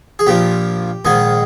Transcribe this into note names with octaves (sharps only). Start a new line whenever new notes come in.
G#4
A#1 A#2 F3 G4
A#1 G#2 D#3 G#4